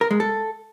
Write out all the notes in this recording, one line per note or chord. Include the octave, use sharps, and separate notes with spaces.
A#4
G#3
A4